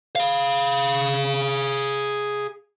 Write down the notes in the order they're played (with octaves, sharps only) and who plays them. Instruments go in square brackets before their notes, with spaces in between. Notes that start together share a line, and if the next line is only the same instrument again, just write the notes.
[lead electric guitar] G#4 F5